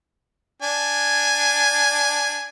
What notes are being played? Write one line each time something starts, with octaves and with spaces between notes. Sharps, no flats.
D4 G#5